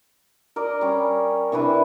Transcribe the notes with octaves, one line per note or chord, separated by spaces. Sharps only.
A#4 D5 D#5
G3 C#4
C3 E3 D4 B4